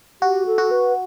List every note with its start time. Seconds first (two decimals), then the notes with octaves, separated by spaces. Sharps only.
0.21 F#4 G4
0.46 A4
0.58 F#4
0.71 B4